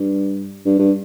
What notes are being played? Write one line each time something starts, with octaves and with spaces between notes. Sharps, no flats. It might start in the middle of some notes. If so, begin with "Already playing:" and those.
Already playing: G2
G2
G2